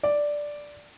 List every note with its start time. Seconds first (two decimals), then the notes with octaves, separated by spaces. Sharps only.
0.03 D5